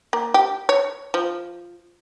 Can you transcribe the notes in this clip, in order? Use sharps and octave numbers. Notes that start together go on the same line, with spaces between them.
A#3
G4
C#5
F3